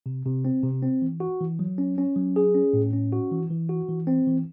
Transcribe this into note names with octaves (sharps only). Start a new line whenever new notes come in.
C3
C3
C4
C3
C4
E3
F#4
E3
F#3
C#4
C#4
F#3
G#4
C#4
A2
C#4
F#4
E3
E3
F#4
E3
C4
E3